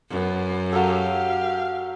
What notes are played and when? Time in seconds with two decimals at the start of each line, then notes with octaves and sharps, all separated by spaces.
0.11 F#2 B3
0.72 F#3 G4 A4 F5